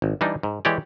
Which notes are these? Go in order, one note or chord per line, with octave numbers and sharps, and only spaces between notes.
G#1
E3 G3 D4 D#4
G#2
E3 G#3 G4 C#5 D5